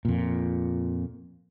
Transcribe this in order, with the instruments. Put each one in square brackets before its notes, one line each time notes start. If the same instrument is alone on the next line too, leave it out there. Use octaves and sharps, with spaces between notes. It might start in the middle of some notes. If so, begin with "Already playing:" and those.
[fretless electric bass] F2 A#2